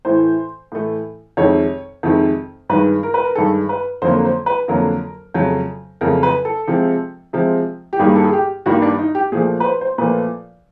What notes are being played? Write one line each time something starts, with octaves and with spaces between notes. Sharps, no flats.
A2 E3 A3 C5
A2 E3 A3
F2 C3 D#3 G#3 C#5
F2 C3 D#3 G#3
G2 D#3 G#3 B4
A#4
B4
A#4
G2 D#3 G#3 A4
B4
F2 D3 F#3 A#3 C5
C5
B4
F2 D3 F#3 A#3 A#4
F2 C#3 F#3 A3
F2 C#3 F#3 A3 A#4
B4
A4
C3 F3 G#3
C3 F3 G#3
G4
G2 D#3 G3 A#3 G#4
A4
G#4
G4
G2 D#3 G3 A#3 F#4
D4
D#4
G4
A#2 F3 A3 G#4
B4
C5
C5
A#2 F3 A3 B4